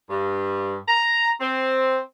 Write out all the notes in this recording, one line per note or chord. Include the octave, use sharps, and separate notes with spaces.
G2
A#5
C4